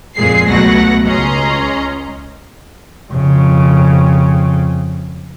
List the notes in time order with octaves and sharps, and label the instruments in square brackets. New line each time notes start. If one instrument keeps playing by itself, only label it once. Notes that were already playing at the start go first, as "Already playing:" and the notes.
[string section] F2 A#2 G#3 G#4 C7
C#2 B2 F#3 A3 F#5 A#6
C#2 C#4 D#5 A#5 C6
[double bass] F2 C#3